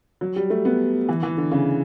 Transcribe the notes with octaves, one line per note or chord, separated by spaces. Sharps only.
F#3
G3
A3
B3
E3
E3
D3
C#3